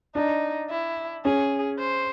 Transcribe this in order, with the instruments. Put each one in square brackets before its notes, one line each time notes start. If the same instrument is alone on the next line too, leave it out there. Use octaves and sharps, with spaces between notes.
[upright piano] D4 [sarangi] D#4
[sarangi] E4
[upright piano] C#4 [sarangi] G#4
[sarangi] C5